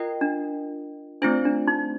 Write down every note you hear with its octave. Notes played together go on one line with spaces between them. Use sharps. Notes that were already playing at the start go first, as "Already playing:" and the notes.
Already playing: F4 A#4 D#5 G5
D4
A3 C4 D4 F4 C5
D4
D#4